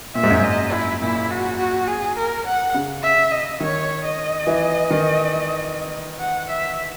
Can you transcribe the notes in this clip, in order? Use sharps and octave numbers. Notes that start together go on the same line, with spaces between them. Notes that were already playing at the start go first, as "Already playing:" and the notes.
A#2 E5
G#2
F#2
G#2 D#5
E4
A#2 E4
F#4
F#4
G#4
A#4
F#5
C#3
E5
D#5
D#3 C#5
D#5
E3
D#3
F#5
E5